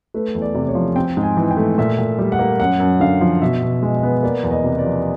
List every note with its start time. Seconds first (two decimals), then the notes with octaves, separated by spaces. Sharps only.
0.14 A3 B4
0.35 E2
0.42 D5
0.55 C3
0.69 C#5
0.75 F3
0.96 C4 G5
1.17 G#2
1.23 G#5
1.37 E3
1.51 G5
1.57 A3
1.78 A#2 E5
1.98 A#2
2.19 G3
2.32 F#5
2.39 A#3
2.60 F#2 F#5
2.80 F#2
3.00 D3 F5
3.21 F3
3.42 B2 E5
3.62 B2
3.83 G#3
3.97 D#5
4.03 B3
4.23 A#3 D5
4.43 E2
4.51 D#5
4.64 C3
4.78 D5
4.85 F3